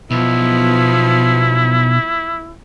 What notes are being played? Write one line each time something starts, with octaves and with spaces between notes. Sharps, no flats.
B1 F3 B3 E4